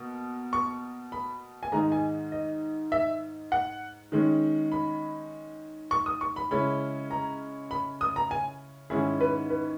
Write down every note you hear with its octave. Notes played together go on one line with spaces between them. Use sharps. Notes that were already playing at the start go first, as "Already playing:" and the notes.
Already playing: B2 A#3
C#6
B5
G#5
G#2 D#3 G#3 D#4 A#5
G#5
D#5
E5
F#5
D#3 G#3 C#4
B5
C#6
D#6
C#6
B5
C#3 G#3 C#4 E4 B5
A#5
B5
D#6
A#5
G#5
G#2 D#3 G#3 C#4 E4 G#4
B4
B4